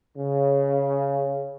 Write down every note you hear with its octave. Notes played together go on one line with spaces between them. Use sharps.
C#3